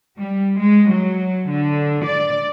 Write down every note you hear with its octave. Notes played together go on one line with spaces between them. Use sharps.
G3
G#3
F#3
D3
D5